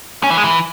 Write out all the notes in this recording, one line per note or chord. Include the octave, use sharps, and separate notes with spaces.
C#4
E3
G#3
E3